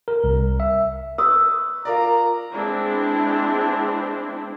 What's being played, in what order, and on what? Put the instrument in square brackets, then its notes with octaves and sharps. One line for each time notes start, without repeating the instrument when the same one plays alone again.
[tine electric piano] A#4
C2
E5
[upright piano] B4 [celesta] C#6 D#6 E6
[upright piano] F4 A#4 D5 [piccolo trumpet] A#5
[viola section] G#3 B3 C4 D4 E4